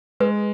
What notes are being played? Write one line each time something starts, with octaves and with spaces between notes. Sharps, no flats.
G#3 B4